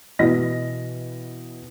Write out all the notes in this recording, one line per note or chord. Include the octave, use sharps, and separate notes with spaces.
B2 E3 D#5 A#6